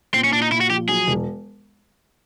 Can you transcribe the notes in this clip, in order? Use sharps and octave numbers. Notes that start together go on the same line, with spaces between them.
A#2 C4
C#4
A#2 D4
D#4
A#2 E4
F#4
F3 G4
F#3 G#4
E1